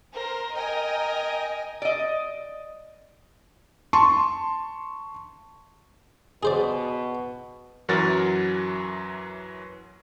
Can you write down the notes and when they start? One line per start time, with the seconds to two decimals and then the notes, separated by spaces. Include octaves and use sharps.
0.14 A#4 C5
0.54 A#4 D#5 G5 G#5
1.82 D5 D#5
3.93 A5 C6 C#6
6.43 B2 G#4 C5 D5
7.89 F#2 E3 F#3 F#4 A#4 A6